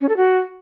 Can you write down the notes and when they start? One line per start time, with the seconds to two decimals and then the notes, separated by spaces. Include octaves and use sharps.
0.01 C#4
0.09 A4
0.17 F#4